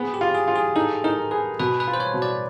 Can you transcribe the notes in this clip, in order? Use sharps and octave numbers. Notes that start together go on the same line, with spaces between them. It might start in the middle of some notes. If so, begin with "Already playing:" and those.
Already playing: B3 G#4
G4
F4
G#4
F4
G#4
D#4 A4
D#4 A#4
G#4 B4
B2 B4
B4
F4
C5
C#5
B2
D5